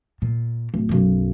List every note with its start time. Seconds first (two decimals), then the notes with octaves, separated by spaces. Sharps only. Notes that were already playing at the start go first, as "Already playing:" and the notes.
0.22 A#2
0.74 D1
0.89 B1 F#2